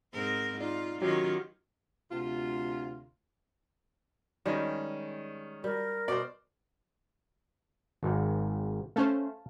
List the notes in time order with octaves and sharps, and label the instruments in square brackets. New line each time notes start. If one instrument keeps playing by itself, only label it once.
[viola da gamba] G#2 C4 A#4
[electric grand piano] D#4 D5 [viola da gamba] F4
[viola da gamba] D#3 C#4 F4 [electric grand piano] F#3 G4 C#5
[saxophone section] D2 C3 F4
[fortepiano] D#3 C#4 [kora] G3 G#3
[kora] G3 [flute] A#4
[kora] B2 [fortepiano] C5 D5
[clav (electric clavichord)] G#1 G#2
[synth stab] A3 C#4 C5 [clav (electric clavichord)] F5 A5